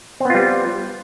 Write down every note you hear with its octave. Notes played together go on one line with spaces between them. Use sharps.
G3 B3 C4 F4